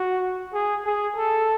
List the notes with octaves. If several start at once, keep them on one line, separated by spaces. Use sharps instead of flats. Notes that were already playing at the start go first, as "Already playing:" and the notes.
Already playing: F#4
G#4
G#4
A4